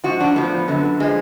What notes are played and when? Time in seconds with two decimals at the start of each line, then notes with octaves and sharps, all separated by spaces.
0.04 G#2 F3 F#4
0.20 D4
0.36 A2 F3 B3
0.68 F#2 D3 F#3
1.00 F3 G#3